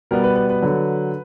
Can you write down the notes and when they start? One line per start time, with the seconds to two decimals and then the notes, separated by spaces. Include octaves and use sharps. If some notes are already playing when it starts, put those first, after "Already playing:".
0.11 B2 G3 B3 A#4
0.24 B4
0.36 B4
0.50 B4
0.62 D3 F#3